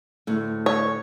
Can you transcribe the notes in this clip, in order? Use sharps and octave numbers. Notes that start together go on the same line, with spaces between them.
D2 A2
C#5